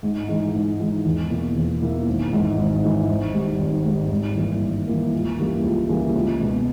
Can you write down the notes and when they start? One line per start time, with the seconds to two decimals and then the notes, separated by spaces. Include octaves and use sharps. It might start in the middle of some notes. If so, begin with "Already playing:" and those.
0.03 G#2
0.28 E3 G#3 D#4
0.54 G#2
0.79 E3 G#3 D#4
1.05 E2
1.30 B2 A#3 E4
1.56 E2
1.82 B2 A#3 E4
2.07 G#1
2.33 G#2 E3
2.57 G#1
2.84 G#2 E3
3.09 G#1
3.34 G#2 G3
3.59 G#1
3.85 G#2 G3
4.10 G#1
4.36 G2 E3 A#3
4.62 G#1
4.87 G2 E3 A#3
5.12 C#2
5.39 C#3 E3 G3 A#3
5.64 C#2
5.89 C#3 E3 G3 A#3
6.15 C#2
6.40 B2 G#3